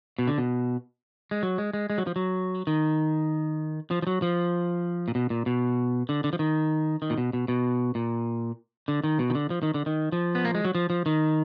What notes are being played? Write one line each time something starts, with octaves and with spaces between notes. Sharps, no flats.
B2
D3
B2
G#3
F#3
G#3
G#3
G#3
F#3
F3
F#3
D#3
F3
F3
F#3
F3
A#2
B2
A#2
B2
D3
D3
F3
D#3
D#3
A#2
B2
B2
B2
A#2
D3
D#3
B2
D#3
D3
F3
D#3
D3
D#3
F3
B3
A#3
G#3
F#3
F3
F3
D#3